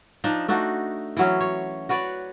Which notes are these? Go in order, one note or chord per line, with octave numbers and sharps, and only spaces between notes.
F3 D4 D#4
A3 D4 D#4 F#4
E3 F#3 C#4
C#5
F#4 B4 C#5 D5